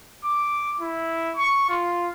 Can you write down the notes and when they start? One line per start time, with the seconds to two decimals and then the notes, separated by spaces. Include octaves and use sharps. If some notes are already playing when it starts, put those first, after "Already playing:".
0.25 D6
0.80 E4
1.37 C#6
1.69 F4